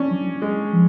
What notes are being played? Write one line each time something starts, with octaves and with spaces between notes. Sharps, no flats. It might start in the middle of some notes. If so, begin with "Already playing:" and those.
Already playing: C#4 D4
F#3
G#3
F3